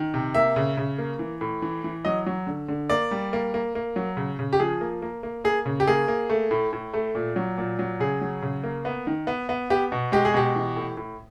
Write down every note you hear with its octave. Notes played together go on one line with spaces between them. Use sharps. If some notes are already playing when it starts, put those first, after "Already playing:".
Already playing: D#3
C3
A#3 E5
C#3
C#3
A#3
E3
A2
E3
E3
F#3 D#5
F#3
D3
D3
A#3 D5
G3
A#3
A#3
A#3
F#3
C#3
C#3
G4
F3 G#4
A#3
A#3
A#3
A#3 G#4
C#3
G4
A#3 G#4
A#3
A3
A2
A2
A3
A#2
F#3
A#2
F#3
C#3 G#4
F#3
C#3
A#3
B3
D#3
B3
B3
B3 G4
B2
G#3 G4
G#4
B2 G4
E3
A2
A2